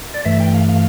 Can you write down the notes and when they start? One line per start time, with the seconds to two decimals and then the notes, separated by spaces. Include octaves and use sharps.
0.14 D5
0.25 G2 E3 A3 E5
0.40 G5
0.54 F5
0.69 F5